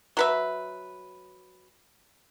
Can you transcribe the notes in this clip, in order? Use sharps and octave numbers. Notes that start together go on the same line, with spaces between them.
F#3 B4 E5